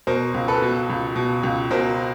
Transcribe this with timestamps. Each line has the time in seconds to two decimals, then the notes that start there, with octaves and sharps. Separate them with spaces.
0.07 B2 A#4 C5
0.34 C#2
0.48 A4 B4
0.62 B2
0.90 C#2
1.16 B2
1.43 C#2
1.71 B2 A#4 C5